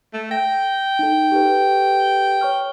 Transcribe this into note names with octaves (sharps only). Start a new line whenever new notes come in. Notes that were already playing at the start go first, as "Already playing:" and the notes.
A3
G5 A#6
D#4 A4
G4 A4 B4
C#5 C#6 F6